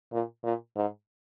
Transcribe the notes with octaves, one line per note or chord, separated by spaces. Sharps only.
A#2
A#2
G#2